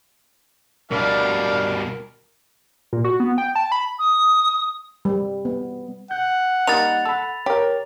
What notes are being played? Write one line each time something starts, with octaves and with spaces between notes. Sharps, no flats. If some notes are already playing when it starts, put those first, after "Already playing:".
B2 G3 D4 A#4 F5
A#2
F#4
B3
G5
A5
B5
D#6
G3
B3
F#5 G6
G3 A#3 D#4 A6 F7
A4 B5 E6
G4 A#4 C#5